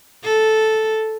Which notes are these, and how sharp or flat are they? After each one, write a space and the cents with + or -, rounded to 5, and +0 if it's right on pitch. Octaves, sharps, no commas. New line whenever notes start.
A4 -5